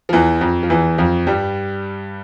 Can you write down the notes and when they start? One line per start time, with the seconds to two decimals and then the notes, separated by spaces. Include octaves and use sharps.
0.09 F3
0.13 E2 E3
0.41 F2 F3
0.63 F3
0.70 E2 E3
0.98 F2 F3
1.27 G2 G3